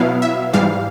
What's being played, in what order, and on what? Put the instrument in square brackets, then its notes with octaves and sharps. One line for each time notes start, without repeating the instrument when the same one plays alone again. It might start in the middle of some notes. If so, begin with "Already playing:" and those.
Already playing: [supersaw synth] B2 F#3 B3 E4 F5
E5
G#2 E3 G3 F5